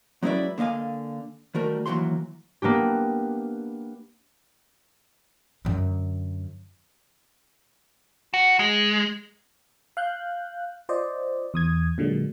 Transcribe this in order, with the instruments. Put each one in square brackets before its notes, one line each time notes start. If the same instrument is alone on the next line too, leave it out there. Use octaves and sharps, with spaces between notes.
[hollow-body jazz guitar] F#3 G#3 C#4 E4 B4 D5
D3 A#3 D#5 F5 G#5
D#3 G3 A3 F#4 A#4
D#2 C3 E3 F#3 F#4 C6
[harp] A#3 B3 D4 G4
[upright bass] F#2 D3
[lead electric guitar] F#4
G#3
[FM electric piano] F5 F#6 G6
F4 C5 D5 D#5
E2 D#6 G#6
A#2 D3 F#3 G#3